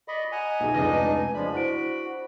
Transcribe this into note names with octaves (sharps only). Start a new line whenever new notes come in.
D5 D#5 B5 C#6
D#5 F#5 G#5 A#5
B1 G#4
F1 C#2 D4 D#4 B4 D#5 A#6
F3 G#3 D4 B5
E4 F#4 C5 D7